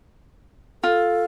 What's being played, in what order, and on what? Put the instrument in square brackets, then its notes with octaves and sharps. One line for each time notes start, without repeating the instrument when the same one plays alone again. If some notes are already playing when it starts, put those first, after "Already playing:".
[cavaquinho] F4 [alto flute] A4